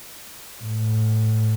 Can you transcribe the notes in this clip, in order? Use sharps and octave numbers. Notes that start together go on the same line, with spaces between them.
A2